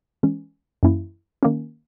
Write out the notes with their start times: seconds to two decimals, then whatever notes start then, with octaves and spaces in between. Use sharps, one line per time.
0.23 E3 G#3 C#4
0.83 F#2 E3 A#3 C#4 E4
1.43 D#3 A#3 C#4